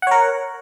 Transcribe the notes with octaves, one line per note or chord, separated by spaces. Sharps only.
A#4 C#5 F#5